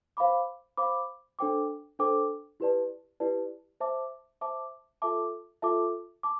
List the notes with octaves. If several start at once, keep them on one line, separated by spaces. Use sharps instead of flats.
C5 F5 B5 D6
C5 F5 B5 D6
D4 A4 C5 G5 D6
D4 A4 C5 G5 D6
E4 G4 B4 D5 A5
E4 G4 B4 D5 A5
C5 E5 A5 D6
C5 E5 A5 D6
F4 A4 E5 A5 D6
F4 A4 E5 A5 D6
A5 D6